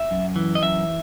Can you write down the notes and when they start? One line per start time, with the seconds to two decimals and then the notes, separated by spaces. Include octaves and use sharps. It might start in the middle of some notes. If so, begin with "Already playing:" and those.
Already playing: E5
0.11 F#2
0.36 E3
0.55 D#5
0.62 F#2 E5